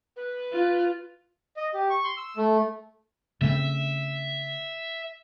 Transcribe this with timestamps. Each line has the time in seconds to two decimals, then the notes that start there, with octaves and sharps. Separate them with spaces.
0.16 B4
0.53 F4
1.57 D#5
1.74 G4
1.90 C#6
2.04 C6
2.17 E6
2.37 A3
3.41 C#3 A3 C4 E5